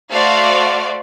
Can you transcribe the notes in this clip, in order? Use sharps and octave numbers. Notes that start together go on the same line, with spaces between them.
A3 F#4 C5 D5 F5